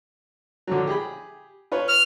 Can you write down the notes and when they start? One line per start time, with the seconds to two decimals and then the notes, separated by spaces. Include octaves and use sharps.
0.67 D3 F3 F#3
0.87 G4 G#4 B5
1.72 F4 B4 C#5
1.88 F6